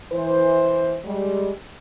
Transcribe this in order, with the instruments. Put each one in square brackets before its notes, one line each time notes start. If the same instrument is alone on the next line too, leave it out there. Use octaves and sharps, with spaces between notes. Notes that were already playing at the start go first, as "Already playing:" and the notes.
[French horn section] E3 C5
G3 G#3